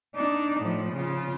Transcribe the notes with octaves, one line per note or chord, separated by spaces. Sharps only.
D4 D#4
A2 F3
C#3 F4